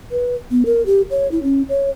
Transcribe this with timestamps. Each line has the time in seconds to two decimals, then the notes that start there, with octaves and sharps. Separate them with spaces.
0.11 B4
0.51 B3
0.66 A#4
0.86 G4
1.11 C#5
1.32 E4
1.43 C#4
1.69 C#5